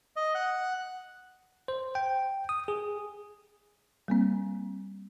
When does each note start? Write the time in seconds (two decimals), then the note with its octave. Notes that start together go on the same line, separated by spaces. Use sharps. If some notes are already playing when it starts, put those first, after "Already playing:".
0.16 D#5
0.35 F#5
1.68 C5
1.95 G5
2.49 D#6
2.68 G#4
4.08 G3 A#3 C4